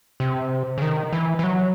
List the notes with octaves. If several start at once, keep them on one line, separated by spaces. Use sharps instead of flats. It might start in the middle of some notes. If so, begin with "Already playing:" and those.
C3
C#3
D#3
E3
E3
F#3